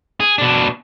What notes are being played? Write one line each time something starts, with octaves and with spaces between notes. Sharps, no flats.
G#4
B2 D4